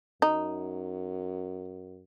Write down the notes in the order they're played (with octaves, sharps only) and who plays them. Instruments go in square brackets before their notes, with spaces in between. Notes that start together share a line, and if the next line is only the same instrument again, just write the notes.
[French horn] F#2 [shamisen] D#4